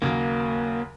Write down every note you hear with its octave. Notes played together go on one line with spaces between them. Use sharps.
D#2 C#3 F#3 A#3